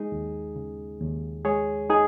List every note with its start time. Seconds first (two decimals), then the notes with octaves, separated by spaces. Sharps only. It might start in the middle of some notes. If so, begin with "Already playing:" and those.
Already playing: G#3 D#4 G#4
0.12 D#2
0.56 C#3
1.01 D#2
1.45 G#3 G#4 C#5
1.90 D#4 G#4